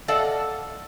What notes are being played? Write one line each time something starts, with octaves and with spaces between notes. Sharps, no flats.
A4 D5 D#5 F5 F#5 A5